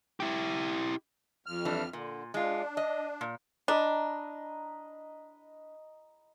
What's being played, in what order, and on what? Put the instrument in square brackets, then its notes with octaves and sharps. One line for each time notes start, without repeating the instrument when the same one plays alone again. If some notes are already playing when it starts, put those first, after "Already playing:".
[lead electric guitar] E4 G4
[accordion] F2 F6
[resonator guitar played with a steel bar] E3 G3 D4
[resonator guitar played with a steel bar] A#2 [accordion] D3
[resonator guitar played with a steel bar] G#3 F4 [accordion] D4
[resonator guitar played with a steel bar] D#5
A#2
[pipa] D4 [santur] D#5 A#5 B5